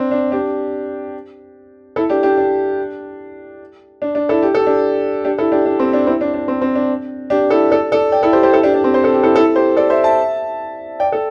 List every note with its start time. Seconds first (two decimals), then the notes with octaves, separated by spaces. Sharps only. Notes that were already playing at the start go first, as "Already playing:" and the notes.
Already playing: C4 D4
0.11 D4
0.32 D4 G4
1.96 E4 A4
2.10 D4 G4
2.23 D4 G4
2.38 D4
4.02 D4
4.15 D4
4.29 E4 A4
4.43 G4
4.55 A4
4.67 D4 G4
5.24 D4 G4
5.38 E4 A4
5.52 D4 G4
5.66 D4
5.79 C4
5.93 D4
6.07 C4 E4
6.21 D4
6.34 D4
6.48 C4
6.61 C4
6.75 D4
7.30 D4 G4
7.50 E4 A4
7.72 A4 D5
7.92 A4 D5
8.12 D5 G5
8.23 E4 A4
8.33 G4 C5
8.43 G4 C5
8.53 E4 A4
8.63 D4 G4
8.74 D4
8.84 C4
8.94 C5
9.04 A4
9.14 G4
9.23 E4 A4
9.36 E4 A4
9.56 G4 C5
9.77 A4 D5
9.90 C5 E5
10.04 E5 A5
11.00 D5 G5
11.12 A4